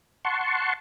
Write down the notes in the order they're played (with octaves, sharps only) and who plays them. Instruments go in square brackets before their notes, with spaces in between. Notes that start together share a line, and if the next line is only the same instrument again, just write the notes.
[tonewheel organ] F#5 A5 C6 C#6